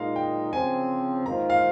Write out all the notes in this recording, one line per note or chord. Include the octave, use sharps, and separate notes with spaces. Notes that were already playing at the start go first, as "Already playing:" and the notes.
Already playing: A#2 G#3 D#4 F5
G5
C#3 F3 C4 G#5
G#2 D#3 A#3 F4 C5 A#5
F5